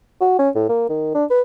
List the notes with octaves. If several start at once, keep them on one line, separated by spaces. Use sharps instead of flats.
F#4
C#4
A2
A#3
D#3
D4
B4